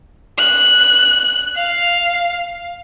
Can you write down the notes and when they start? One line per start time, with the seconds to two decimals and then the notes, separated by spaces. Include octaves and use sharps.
0.38 F#6
1.56 F5